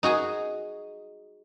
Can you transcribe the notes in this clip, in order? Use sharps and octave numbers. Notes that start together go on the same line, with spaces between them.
D#4 F#4 G#4 G#5